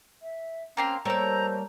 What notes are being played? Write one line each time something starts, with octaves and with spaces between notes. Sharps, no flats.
E5
A#3 C4 C#4 A#5 C6
G3 A3 A#3 C5 C#5 A#5 E6